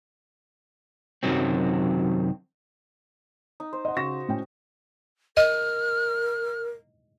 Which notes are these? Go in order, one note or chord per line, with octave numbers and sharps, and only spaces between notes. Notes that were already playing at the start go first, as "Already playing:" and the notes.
F#2 A2 C3 D#3 F#3 C4
D#4
C5
D#5 F#5
C#3 F#4 A#6 E7
A2 C#4 G5
A#4 D#5 F6